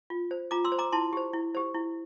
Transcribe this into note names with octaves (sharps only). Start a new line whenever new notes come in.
F4
C5
F4 A#5 D6
C6 E6
C5
A#5 D6
E4 A5 C6
G4 C5
E4
G4 C5
E4